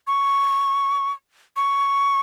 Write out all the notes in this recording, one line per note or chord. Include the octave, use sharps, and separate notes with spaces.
C#6
C#6